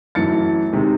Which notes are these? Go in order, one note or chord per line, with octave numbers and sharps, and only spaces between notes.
F#2 E3 A3 A6 C#7
C3 D#3 G#3